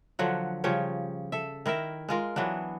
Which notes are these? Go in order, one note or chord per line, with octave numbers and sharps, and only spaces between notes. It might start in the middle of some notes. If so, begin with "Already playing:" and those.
D3 F3 F#3 F#5
C#3 F3 G3 C#5
A4 E5
D#3 E4 A#4 E5
G#3 F4 A#4
E3 F#3 B3 D4